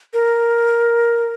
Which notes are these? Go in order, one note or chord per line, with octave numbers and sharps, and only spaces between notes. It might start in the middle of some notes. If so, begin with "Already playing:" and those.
A#4